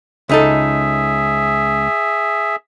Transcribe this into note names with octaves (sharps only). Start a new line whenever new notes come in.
C#2 D#4 G#4 A4 E5